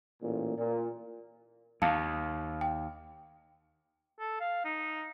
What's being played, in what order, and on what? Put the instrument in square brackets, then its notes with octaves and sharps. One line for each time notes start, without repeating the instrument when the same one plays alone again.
[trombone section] A1 A#2
A#2
[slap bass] D#2 [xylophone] F5 A5 C#7
[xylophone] G5
[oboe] A4
F5
D#4